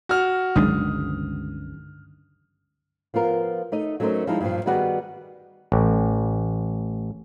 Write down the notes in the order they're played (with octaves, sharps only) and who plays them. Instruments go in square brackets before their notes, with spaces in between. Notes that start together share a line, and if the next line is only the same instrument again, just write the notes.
[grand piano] F#4 F6
[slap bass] G1 C#2 D4 [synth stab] D#3 F#3 G#3 [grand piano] D#6
[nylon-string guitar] F3 B3 F4 A#4
A3 D#4 D#5
F#3 A3 C#4 D#4 A#4 C5
F3 G3 G#3 D#4 E4
G2 A#2 F3
D#3 G3 B3 F#4 G#4 D5
[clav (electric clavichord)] A1